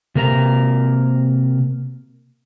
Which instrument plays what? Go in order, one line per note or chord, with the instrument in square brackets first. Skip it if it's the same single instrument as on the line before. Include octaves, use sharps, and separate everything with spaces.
[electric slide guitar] C3 A#3 A#4 B4 A#5